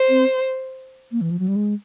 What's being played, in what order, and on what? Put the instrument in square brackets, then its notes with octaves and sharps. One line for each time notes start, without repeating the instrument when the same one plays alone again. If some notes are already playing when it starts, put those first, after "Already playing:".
Already playing: [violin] C5
[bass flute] C4
A#3
E3
F3
F#3
G3
G#3